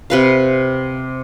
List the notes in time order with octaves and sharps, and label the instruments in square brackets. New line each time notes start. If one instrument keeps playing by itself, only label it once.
[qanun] C3 B4 F5